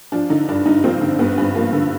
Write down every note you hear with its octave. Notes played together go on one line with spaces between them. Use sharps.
F3 D4
D3 D#4
G2 D4
G2 D#4
F3 C4
D3
G2 B3
G2
F3 A#3
D3